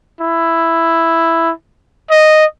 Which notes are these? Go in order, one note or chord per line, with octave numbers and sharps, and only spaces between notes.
E4
D#5